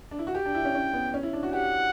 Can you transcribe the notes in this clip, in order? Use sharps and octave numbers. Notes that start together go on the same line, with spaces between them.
D4
E4
F#4
G4 G5
D4
E4
C#4
C#4
B3
C#4
E4
D4
F#4
G4 F#5